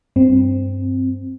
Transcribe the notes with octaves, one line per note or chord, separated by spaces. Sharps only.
G2 C4